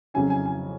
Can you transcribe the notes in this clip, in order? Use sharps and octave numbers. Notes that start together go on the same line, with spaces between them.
F2 C#3 F#3 C#4 G#5
G#5
G#5